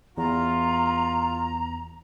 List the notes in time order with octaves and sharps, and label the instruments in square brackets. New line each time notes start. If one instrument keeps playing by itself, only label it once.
[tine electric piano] E2 [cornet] F4 [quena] A#5